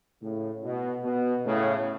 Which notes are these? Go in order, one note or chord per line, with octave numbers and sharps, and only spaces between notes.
A2 C#3
B2
B2
A2 C#3